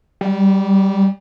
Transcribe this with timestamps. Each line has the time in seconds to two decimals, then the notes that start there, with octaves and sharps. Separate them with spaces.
0.21 G3